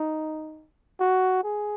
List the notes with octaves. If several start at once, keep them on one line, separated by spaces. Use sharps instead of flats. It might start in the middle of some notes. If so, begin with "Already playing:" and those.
Already playing: D#4
F#4
G#4